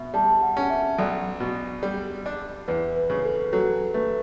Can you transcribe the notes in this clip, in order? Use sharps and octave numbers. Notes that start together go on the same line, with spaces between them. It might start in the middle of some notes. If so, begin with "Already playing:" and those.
Already playing: B2 E5
G3 A5
F#5
C#4
F#5
E5
B1 D5
B2
G3
D4
E2 B4
B4
C#3
A4
F#3 A4
A3 B4